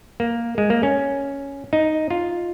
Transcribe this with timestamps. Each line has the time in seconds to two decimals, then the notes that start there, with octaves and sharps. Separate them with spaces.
0.20 A#3
0.58 G#3
0.70 A#3
0.83 C#4
1.73 D#4
2.10 F4